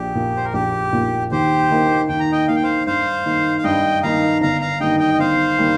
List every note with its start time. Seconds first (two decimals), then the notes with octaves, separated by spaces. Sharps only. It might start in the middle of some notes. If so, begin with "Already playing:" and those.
Already playing: A#1 G4
0.15 A#2 A#3 F4
0.37 C5
0.45 A#4
0.53 A#1 G4
0.92 A#2 A#3 F4
1.31 D#2 G4 C5
1.70 D#3 A#3 D#4
2.08 D#2 G5
2.20 A#5
2.32 D#5 G5
2.48 D#3 A#3 D#4 F5
2.56 G5
2.63 C5 F5
2.87 G2 C5 F5
3.25 D#3 A#3 D#4
3.58 F5
3.64 G2 D#5 G5
4.03 D#3 A#3 D#4 F5 A#5
4.41 G1 F5 A#5
4.61 F5 A#5
4.81 G2 D#3 G3 A#3 D#5 G5
4.99 D#5 G5
5.14 D#5
5.19 G1 C5 F5
5.58 D#3 G3 A#3